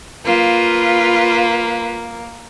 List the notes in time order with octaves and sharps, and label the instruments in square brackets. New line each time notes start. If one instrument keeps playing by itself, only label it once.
[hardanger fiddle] A#3 [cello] F4 B4